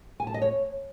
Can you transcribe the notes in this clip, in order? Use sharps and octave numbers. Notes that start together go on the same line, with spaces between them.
G#5
A5
D#5
C#5